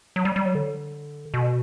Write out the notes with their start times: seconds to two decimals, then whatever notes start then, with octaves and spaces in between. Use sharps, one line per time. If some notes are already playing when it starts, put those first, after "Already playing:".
0.16 F#3
0.25 G3
0.36 G3
0.45 F#3
0.55 D3
1.34 B2